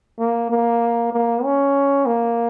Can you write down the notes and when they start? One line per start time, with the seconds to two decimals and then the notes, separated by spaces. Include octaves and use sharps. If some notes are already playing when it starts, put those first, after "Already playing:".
0.19 A#3
0.50 A#3
1.13 A#3
1.44 C#4
2.06 A#3